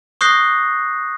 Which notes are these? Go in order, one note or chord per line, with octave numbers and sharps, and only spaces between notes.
C#6 D#6 F#6 G6 A#6 C7